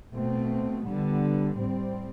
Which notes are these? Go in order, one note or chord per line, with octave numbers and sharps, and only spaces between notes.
B2 A3 C4
D3 G3 B3
A2 G3 C4